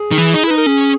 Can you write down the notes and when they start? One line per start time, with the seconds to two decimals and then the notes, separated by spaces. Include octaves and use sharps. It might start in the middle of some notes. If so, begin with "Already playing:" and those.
Already playing: G#4
0.11 D#3
0.18 E3
0.34 D#4
0.44 E4
0.47 D#4 B4
0.57 A#4
0.66 C#4 G#4